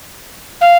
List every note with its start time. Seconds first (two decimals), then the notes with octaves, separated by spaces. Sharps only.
0.61 F5